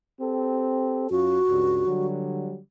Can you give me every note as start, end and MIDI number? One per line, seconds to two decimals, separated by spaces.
0.21 1.08 60
0.21 1.08 67
0.21 1.08 69
1.10 1.38 42
1.10 1.38 61
1.10 1.38 65
1.10 2.07 66
1.48 1.83 37
1.48 1.83 43
1.87 2.59 50
1.87 2.59 54
1.87 2.59 55